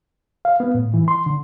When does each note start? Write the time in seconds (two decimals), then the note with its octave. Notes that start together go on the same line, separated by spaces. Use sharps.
0.45 F5
0.60 B3
0.74 A2
0.94 E3
1.08 C6
1.26 D3